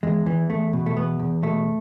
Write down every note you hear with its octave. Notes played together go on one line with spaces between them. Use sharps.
E2 G#3
E2 E3
E2 A3
B2
A3
E2 B3
E2
B2 A3